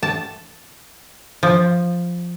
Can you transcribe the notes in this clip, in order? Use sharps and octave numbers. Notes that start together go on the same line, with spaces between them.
A5
F3